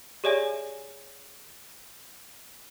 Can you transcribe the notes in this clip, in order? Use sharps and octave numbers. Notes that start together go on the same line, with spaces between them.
G4 G#4 C#5 D5 E5 G#5